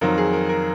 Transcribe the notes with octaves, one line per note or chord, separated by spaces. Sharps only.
F2 D#3 F#3 A#4
G#4
A#4
A#4